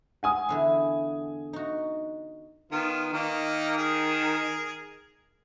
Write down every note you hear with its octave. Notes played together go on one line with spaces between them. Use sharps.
F#5 G#5 D#6
E2 D3 E4
D#4 F#4
D#3 B3 F4
D#3 A#3 D#4
G#4 A#4